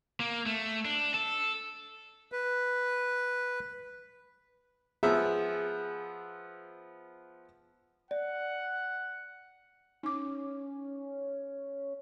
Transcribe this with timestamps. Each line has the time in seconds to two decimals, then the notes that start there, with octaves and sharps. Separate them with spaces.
0.20 A#3
0.46 A3
0.85 D4
1.14 A4
2.32 B4
5.03 F3 B3 G#4 E5
8.11 D5 F#5
10.03 C#4 D#4 D6